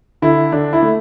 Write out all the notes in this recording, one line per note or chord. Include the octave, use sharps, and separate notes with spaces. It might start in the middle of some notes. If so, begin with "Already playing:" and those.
D3 E4
D3 D4
E4
A3